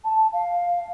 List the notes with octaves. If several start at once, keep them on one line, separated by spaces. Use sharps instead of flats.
A5
F5